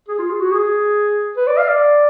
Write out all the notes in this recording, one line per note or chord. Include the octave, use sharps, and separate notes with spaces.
G#4
F4
G#4
F#4
G#4
B4
D5
F5
D5